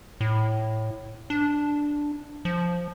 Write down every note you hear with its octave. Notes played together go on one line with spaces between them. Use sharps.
A2
D4
F3